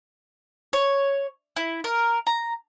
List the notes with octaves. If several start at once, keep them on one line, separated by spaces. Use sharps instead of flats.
C#5
E4
A#4
A#5